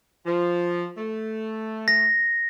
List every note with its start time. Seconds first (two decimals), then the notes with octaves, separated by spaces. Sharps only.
0.26 F3
0.98 A3
1.88 A#6